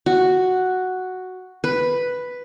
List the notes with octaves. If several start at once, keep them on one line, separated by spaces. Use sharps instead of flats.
F#4
B4